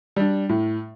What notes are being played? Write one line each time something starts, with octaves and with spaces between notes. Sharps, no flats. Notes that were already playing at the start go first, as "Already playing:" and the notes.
G3 D4
A2